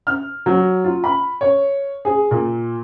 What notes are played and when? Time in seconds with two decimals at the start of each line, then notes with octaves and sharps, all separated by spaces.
0.07 F6
0.46 F#3
0.84 F4
1.04 B5
1.41 C#5
2.05 G#4
2.31 A#2